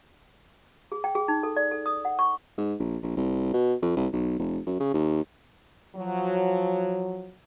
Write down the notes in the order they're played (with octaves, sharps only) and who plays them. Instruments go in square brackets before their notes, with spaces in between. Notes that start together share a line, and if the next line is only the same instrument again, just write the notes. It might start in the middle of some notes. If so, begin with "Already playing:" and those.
[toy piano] G#4
G5
G#4
D#4
A4
D5
A4
D#6
F#5
C#6
[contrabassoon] G#2
A#1
A#1
C2
B2
F2
C2
B1
F1
F#2
C#3
D#2
[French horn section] F3 F#3